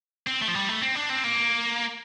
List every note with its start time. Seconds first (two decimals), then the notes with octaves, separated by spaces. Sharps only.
0.27 C4
0.41 A3
0.48 F3
0.55 G3
0.69 A3
0.81 C4
0.95 D4
1.09 C4
1.24 A#3